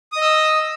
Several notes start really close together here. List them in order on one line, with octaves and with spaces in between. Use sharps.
D#6 D#5 E6